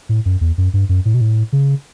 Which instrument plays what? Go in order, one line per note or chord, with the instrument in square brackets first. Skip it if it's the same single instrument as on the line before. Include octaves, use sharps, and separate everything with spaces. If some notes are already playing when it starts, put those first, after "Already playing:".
[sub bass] A2
F#2
E2
F#2
G2
F#2
A2
B2
A2
C#3